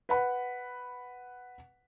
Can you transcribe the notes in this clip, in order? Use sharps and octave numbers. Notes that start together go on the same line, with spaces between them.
B4 F#5 B5